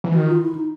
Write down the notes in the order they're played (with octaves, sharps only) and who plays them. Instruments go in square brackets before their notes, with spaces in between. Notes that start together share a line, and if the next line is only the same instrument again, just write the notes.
[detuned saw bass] E3
[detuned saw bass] D#3 [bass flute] F#4
[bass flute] F4
E4
D#4